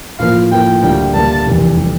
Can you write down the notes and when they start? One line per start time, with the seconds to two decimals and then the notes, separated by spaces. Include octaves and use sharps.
0.19 A2 F3 A#3 F5
0.51 A2 F3 A#3 G5
0.82 D2 D3 G3 A#3 G5
1.14 D2 D3 G3 A#3 A5
1.46 F1 E2 E3 G3
1.77 E3 G3